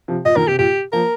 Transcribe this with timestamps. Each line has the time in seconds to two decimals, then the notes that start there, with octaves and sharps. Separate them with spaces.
0.08 C3 F3
0.25 A#2 D#5
0.36 A#2 D#3 A#4
0.47 C3 G4
0.59 A#2 G4
0.93 F3 A#3 A#4